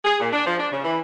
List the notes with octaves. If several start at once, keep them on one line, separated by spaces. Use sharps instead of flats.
G#4
A#2
D4
F3
D4
C#3
E3